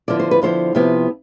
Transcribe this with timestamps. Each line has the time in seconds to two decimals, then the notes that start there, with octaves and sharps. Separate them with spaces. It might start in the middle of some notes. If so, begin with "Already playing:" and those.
0.08 D3 F3 B3 E4 D5
0.20 C5
0.31 B4
0.42 D3 F3 B3 E4 C5
0.75 C3 F3 B3 E4 G4